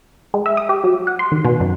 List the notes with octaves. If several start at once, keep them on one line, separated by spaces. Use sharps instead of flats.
G#3
E5
D#6
G4
F#3
F#5
C6
D#3
B2
F#2